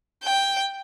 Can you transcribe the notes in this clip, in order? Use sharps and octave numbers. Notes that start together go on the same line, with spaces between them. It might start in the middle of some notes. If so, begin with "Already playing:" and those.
G5